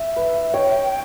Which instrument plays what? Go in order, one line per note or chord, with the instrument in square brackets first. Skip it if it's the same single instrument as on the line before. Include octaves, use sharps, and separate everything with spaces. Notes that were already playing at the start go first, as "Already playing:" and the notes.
Already playing: [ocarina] E5
[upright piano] B4
[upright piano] C#5 [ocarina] G5